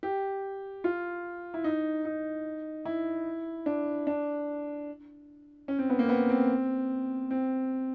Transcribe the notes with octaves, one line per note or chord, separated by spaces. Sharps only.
G4
F4
E4
D#4
D#4
E4
D4
D4
C#4
C4
B3
A#3
C4
B3
C4
C4